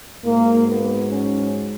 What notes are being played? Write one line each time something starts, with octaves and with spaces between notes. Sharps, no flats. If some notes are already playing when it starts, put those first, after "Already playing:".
G#2 F#3 A#3
B3
C#4